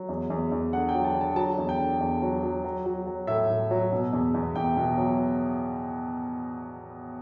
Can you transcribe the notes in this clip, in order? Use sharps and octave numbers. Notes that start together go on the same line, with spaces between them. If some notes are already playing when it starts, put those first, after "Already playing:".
Already playing: F#3
E2
E2
E2
D3 F#5
G5
F#3
A5
D3
A5
F#3 A5
E2
G5
D3
E2
F#3
F#3
F#3
F#3
F#3
A2 E5
A2
F#3
B2
E2
E2
E2 G5
B2
F#3